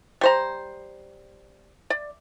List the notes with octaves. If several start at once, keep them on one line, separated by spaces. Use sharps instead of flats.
G3 C5 A#5
D5